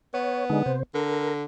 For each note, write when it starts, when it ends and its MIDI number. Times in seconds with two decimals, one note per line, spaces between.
0.14 0.78 59
0.14 0.45 73
0.50 0.63 50
0.50 0.63 56
0.50 0.63 63
0.66 0.83 48
0.66 0.83 72
0.94 1.44 50
0.94 1.34 70